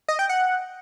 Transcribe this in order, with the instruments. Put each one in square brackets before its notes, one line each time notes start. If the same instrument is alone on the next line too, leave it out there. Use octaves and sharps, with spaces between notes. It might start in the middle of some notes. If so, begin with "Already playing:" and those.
[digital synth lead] D#5
G5
F#5